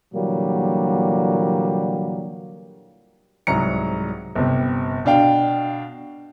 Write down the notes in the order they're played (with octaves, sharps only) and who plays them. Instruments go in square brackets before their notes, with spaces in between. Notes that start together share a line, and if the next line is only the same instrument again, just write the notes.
[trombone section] A#2 D3 E3 F#3 G3 A#3
[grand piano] C2 G#2 F#3 A#5 C#7
G1 C3
B2 D4 F5 G5